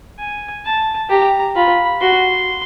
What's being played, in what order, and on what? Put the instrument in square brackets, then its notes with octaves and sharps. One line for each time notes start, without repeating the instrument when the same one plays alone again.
[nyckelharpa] G#5
A5
[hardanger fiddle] G4 [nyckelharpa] A#5
[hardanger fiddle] F4 [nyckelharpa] B5
[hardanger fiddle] F#4 [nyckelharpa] C6